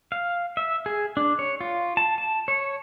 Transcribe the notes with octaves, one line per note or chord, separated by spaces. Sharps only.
F5
E5
G#4
D4
C#5
F4
A5
A5
C#5